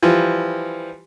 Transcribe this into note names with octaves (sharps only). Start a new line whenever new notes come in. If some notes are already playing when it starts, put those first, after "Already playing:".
E3 F3 G3